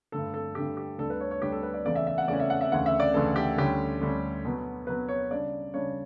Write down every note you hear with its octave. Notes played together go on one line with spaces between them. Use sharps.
G2 D3 A3 A4
A4
G2 D3 A3 G4
G4
D2 D3 G3 D4 A4
B4
C#5
C#5
D2 D3 G3 D4 G4
A4
B4
D5
E2 C#3 E3 A3 C#4 D5
E5
E5
F#5
E2 C#3 E3 A3 C#4 D5
E5
F#5
E5
D2 C#3 E3 F#5
E5
D5
D2 C#3 E3 A4
G4
D2 D3 G3 C#4 G4
D2 D3 G3 C#4
B2 F#3 B3
B2 F#3 B3 B4
C#5
C#3 G3 D4 D5
C#3 G3 D4 C#5